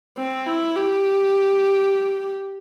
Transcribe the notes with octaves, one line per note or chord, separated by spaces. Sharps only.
C4
E4
G4